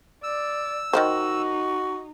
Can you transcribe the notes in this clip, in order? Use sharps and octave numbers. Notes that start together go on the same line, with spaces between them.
D5 E6
D#3 A3 D#4 F#4 C5